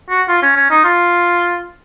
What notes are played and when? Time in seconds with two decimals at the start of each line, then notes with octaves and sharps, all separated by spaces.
0.10 F#4
0.28 F4
0.42 C#4
0.56 C#4
0.70 D#4
0.84 F4